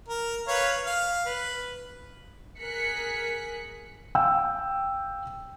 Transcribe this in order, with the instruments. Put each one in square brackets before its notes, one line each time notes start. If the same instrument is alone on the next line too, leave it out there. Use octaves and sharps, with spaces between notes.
[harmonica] A#4
B4 C#5 F5
F5
B4
[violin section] G#4 A#4 F#6 B6 C#7
[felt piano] F5 G5 E6